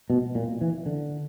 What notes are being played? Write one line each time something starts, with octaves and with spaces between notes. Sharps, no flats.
B2
A#2
E3
D3